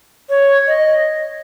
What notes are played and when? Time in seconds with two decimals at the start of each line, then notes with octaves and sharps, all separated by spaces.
0.30 C#5
0.68 D#5